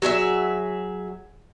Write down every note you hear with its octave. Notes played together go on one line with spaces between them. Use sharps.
F#3 G#4 C#5 E5